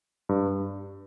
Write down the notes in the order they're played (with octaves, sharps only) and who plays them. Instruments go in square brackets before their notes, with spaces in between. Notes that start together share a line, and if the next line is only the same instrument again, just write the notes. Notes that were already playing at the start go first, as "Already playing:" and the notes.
[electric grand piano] G2